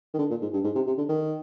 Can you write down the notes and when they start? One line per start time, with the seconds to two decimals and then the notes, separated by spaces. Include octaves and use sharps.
0.14 D#3
0.19 D3
0.30 A#2
0.42 G#2
0.53 G2
0.64 G#2
0.75 C3
0.87 C3
0.98 D3
1.09 D#3